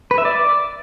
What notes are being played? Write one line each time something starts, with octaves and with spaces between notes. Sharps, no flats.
B4
E5
D5